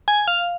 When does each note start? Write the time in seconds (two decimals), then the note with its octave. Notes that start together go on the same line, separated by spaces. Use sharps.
0.08 G#5
0.28 F5